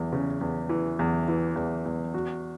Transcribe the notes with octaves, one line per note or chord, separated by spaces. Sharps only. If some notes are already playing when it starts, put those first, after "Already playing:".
Already playing: E2 E3
C#3
E2
E3
E2
E3
E2
E2
F#4